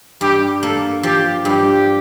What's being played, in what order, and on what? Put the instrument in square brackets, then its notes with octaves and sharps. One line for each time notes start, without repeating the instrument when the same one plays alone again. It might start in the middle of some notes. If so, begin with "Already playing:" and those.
[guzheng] G2 [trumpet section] G4
[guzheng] A#3 [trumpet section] A4
[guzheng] F3 [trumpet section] G4
[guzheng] G2 [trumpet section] G4